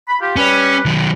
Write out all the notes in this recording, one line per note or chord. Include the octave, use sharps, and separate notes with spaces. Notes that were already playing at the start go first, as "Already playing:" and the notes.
B5
F4 G4
G3 C#4 B4
D#3 F#3